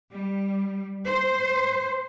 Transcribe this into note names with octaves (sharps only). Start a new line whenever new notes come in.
G3
C5